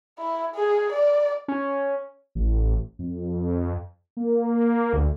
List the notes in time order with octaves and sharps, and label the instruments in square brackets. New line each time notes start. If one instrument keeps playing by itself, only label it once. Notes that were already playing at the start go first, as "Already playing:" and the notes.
[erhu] E4
G#4
D5
[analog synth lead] C#4
[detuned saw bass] A1
F2
A#3
D2